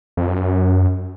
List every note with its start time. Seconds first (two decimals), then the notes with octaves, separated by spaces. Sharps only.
0.17 F2
0.28 F#2
0.38 F#2